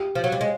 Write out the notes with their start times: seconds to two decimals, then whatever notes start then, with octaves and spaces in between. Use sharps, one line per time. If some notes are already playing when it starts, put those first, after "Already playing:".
Already playing: G4
0.15 F3
0.24 F#3
0.32 G3
0.41 G#3